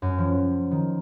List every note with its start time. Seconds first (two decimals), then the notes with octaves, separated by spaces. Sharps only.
0.02 F#2
0.18 F3
0.71 D#3